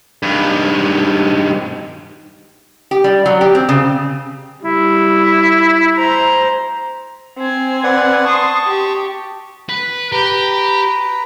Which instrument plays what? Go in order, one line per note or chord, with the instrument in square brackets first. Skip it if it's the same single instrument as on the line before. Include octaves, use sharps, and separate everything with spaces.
[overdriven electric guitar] G2 D#3
[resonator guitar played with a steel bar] G4
G3
F#3
G4
C4
C#3
[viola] G3 [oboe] E4
[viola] C5 A#5
[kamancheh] C4 G#5
[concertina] B4 D5 F#5
[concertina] A5 C#6 [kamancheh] C6 D#6
[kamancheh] G4
[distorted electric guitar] B4
[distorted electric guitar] G4 [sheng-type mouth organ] B4 A#5